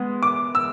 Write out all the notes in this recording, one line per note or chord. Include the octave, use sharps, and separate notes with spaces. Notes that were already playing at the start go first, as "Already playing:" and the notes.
Already playing: G#3 B3
D6
E6